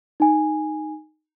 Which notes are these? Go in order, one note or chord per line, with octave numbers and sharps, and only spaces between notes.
D#4 G#5